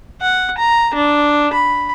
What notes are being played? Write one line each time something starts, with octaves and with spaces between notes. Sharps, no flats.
F#5
A#5
D4
B5